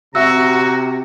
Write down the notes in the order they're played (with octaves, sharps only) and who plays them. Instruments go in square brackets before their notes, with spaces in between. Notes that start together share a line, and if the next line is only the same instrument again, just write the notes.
[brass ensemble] C3 [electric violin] F#4 [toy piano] E5 E6 [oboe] A#5